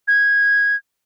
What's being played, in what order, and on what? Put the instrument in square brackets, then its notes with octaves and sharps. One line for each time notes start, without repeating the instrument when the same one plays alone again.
[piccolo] G#6